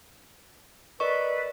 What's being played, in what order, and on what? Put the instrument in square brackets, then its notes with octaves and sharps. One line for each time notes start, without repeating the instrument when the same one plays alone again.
[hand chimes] A#4 D#5 C#6 [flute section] B4 D5